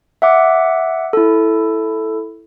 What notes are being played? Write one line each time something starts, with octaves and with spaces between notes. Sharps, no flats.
E5 F#5 D6
E4 A4